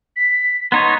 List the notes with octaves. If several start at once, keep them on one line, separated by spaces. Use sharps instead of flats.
B6
B3 D#4 C#5 C6